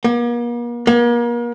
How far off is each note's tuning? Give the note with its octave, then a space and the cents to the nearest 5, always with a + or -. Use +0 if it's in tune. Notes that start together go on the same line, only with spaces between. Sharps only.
A#3 +45
A#3 +40